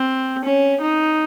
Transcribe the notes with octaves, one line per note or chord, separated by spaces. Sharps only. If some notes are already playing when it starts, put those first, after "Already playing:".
Already playing: C4
C#4
D#4